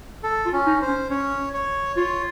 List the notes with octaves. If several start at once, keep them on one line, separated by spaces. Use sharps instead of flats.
A4
F4
C#4
D#4
C5
C#4
C#4 C#5
C#5
F4 C#5